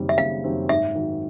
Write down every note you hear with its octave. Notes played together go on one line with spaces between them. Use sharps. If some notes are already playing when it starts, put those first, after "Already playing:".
Already playing: F#1 F#2 D#3 G3 C4
E5
F#1 F5
F#2 D#3 G3 C4
G#2 E5
D#3 F#3